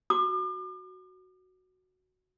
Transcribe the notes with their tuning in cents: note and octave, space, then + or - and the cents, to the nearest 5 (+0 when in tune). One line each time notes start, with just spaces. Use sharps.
F#4 +0 D6 +40